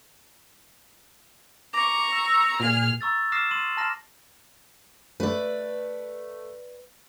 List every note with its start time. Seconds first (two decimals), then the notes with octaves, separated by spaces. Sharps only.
1.73 A#5 C#6 D6
2.12 E6
2.60 A#2 G#4 F6
3.01 A#5 C#6 E6 A6
3.32 D6 D#6 F6 A#6 C7 E7
3.51 C6 D#7 F#7
3.77 A5 A#5 C6 F6 A#6 E7
5.20 A3 B4 D5